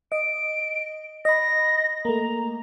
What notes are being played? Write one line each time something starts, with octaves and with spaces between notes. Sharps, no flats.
D#5 D7
D#5 B5 A#6
A3 A#3 A#5